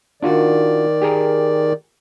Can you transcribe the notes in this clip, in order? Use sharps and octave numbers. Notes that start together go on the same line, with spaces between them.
D#3 D4 F4 F#4 D5
G4 G#4 A#4